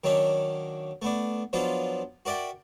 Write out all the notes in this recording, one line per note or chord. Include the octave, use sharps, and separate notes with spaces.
D#3 F#3 A#3 C#4 D4
A3 B3 D4
F3 F#3 B3 D4 F4
F#4 A#4 D5 E5 G5